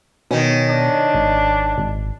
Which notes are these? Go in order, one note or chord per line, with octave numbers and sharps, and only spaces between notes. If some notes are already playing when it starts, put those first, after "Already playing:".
B2 D#3 C#4
D4
G#1
G#1